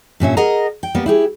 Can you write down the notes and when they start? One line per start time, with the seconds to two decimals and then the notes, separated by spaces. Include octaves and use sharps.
0.20 G2 A#2 C#4 E5
0.37 G#4 A#4 D#5 F#5 A#5
0.83 G5
0.95 G3 A#3 B3
1.06 E4 G4 G#4